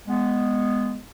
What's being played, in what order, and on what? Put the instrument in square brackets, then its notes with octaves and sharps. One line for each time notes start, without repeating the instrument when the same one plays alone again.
[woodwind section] G#3 B3